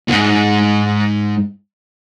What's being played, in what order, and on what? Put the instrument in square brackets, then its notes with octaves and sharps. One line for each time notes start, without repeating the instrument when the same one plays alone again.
[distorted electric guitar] D#2 G#2